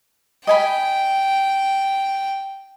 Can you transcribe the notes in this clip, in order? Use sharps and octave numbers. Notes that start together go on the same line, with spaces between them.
D#5 G5 G#5 B5